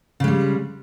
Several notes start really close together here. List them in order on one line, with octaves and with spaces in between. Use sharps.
C#3 G#3 G3